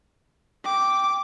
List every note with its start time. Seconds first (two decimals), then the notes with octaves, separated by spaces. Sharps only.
0.65 G5 D6